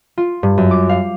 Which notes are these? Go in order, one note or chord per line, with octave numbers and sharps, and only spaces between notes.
F4
G2
F#2
D6
F5